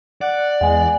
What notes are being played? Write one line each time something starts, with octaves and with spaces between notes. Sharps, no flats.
D5 F#5
E2 G#3 F#5 G#5